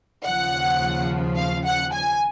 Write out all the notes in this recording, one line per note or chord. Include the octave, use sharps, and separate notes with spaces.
D#2 C#3 F3 F#5
F5
F#5
G#5